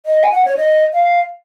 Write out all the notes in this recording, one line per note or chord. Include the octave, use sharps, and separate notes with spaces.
D#5
G#5
F#5
C#5
D#5
F5